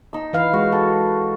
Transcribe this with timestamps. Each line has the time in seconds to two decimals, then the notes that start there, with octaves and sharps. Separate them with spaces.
0.13 D#4 E6
0.33 E3 B4 F5
0.53 G#3 F#4
0.72 F#4 A4